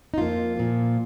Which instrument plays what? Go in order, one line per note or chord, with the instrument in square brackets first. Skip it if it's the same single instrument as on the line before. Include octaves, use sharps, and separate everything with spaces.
[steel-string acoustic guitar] D#4
F2 F3 A#3 F4
A#2 F3 A#3